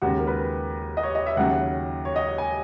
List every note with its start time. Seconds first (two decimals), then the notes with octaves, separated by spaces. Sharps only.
0.02 D#2 C#3 G#3 F#4
0.19 A#4
0.27 B4
0.97 D#5
1.03 C#5
1.15 D#5
1.26 E5
1.37 D#2 C#3 F#3 F#5
2.05 C#5
2.16 D#5
2.38 G#5